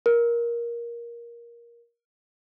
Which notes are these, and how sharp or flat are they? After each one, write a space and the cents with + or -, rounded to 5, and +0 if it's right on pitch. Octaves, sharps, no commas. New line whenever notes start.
A#4 +15